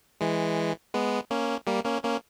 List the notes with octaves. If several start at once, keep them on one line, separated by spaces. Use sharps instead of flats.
E3 G#3
G#3 B3
A#3 C#4
G3 A#3
A#3 C#4
A#3 C#4